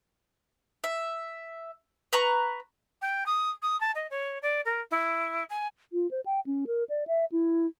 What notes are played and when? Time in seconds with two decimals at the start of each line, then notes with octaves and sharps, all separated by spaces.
0.84 E5
2.13 B4 A#5 C#6
3.02 G5
3.26 D#6
3.62 D#6
3.81 A5
3.95 D#5
4.10 C#5
4.42 D5
4.65 A#4
4.91 E4
5.49 G#5
5.93 F4
6.11 C5
6.26 G5
6.46 C#4
6.67 A#4
6.89 D5
7.07 E5
7.32 E4